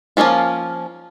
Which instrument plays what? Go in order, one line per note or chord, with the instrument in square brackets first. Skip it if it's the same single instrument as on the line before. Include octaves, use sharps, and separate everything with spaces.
[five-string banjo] F3 A3 A#3 C#4 F4